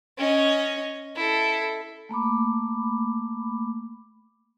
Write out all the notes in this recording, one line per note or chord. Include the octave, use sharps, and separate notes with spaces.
C#4 D#5
E4 A4
A3 A#3 B5 D6